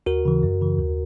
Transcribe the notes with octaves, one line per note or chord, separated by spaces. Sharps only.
D#2 F#4 A#4
C#3 E3
F#2
C#3 E3
D#2